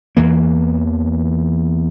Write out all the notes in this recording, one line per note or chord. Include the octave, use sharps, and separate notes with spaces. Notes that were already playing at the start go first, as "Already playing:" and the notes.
E2 E3 A#3